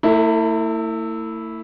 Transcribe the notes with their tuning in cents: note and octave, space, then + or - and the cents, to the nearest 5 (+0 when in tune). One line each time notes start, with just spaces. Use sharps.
A3 +45 E4 -10 A4 +0